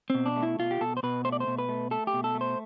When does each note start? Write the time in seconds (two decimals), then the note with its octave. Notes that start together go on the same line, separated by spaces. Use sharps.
0.10 B2 C4
0.26 D4
0.36 A3
0.43 E4
0.59 B2 F4
0.71 G4
0.81 B2 A4
0.97 C5
1.03 B2 B4
1.25 A3 C5
1.32 D5
1.40 C5
1.47 B2
1.59 B4
1.69 A3
1.91 A3 A4
2.07 G4
2.14 B2
2.24 A4
2.35 A3
2.41 C5